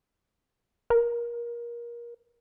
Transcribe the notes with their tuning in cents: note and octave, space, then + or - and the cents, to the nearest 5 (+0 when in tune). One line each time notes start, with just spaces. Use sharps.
A#4 +25